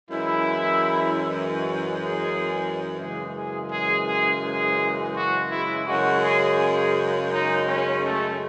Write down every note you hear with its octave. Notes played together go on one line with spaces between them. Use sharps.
F#2 E3 G#3 E4
F#4
G#4
F#2 C#3 E3 G#3 G#4
G#4
G#4
G#4
G#4
F#4
E4
F#2 C#3 G#3 F#4
G#4
G#4
D#4
C#4
A3